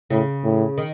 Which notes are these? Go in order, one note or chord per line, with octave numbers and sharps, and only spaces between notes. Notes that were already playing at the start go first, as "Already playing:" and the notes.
A2 C#3
A2
D#3